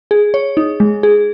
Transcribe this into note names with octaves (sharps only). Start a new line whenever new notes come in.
G#4
C#5
D#4
G#3
G#4